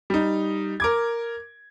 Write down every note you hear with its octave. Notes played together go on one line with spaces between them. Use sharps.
G3 D#4
A#4 D6 G#6